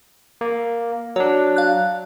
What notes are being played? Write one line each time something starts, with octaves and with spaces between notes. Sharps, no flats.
A#3
F#3 D4 C#5
F5 F#6